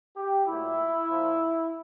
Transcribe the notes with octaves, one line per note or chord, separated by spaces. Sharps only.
G4
A#2 F#3 A3 E4
A#2 F3 A#3